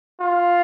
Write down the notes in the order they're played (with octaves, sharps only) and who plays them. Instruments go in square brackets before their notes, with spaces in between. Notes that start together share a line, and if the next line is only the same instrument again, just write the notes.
[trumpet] F4